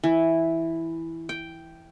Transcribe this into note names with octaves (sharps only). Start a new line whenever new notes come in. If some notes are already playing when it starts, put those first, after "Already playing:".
E3
G5